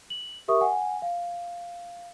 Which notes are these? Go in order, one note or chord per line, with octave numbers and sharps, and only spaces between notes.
F#7
G4 A#4 E5 C#6 D#6
F#5 G#5
F5